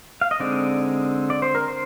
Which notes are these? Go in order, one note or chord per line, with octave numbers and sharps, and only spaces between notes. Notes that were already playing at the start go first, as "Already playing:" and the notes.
F5
D#5
D3 G#3 C4 D#4 D5
D5
C5
A#4
C5